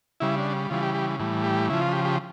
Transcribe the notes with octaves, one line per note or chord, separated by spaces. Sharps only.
C#3 G3 E4
D4
C#3 E3 G3 F4
G4
G4
A2 E3 G3
G4
C#3 F3 E4
F4
G4
G4